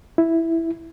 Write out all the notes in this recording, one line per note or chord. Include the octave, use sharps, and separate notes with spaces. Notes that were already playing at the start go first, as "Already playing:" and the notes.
E4